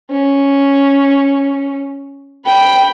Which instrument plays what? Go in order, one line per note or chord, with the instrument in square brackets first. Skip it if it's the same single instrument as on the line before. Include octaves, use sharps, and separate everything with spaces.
[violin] C#4
G5 B5